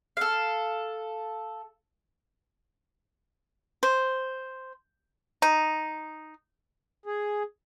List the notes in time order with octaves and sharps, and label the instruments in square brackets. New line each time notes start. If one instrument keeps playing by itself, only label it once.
[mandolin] A4 F5
[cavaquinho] C5
[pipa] D#4
[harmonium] G#4